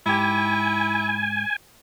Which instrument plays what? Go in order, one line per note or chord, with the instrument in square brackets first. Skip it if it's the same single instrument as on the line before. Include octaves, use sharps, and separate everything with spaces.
[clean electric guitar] G#2 G4 [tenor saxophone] E4 [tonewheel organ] G#5